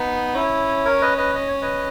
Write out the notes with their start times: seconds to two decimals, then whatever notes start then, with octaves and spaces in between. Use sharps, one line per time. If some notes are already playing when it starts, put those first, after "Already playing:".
Already playing: B3 D#4
0.35 C#4 E4
0.85 A#4 C#5
1.01 B4 D#5
1.18 B4 D#5
1.35 D#5
1.48 C#5
1.62 B4 D#5